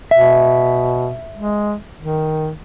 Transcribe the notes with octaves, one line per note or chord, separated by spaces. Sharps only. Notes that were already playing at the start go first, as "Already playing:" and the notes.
B2 E5
G#3
D#3